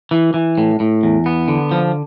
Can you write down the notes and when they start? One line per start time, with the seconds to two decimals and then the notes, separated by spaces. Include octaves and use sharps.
0.11 E3
0.34 E3
0.58 A2
0.80 A2
1.03 E2
1.26 B3
1.48 D3
1.71 F3